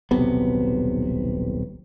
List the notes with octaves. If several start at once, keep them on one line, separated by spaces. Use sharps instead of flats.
D#1 B1 C3 B3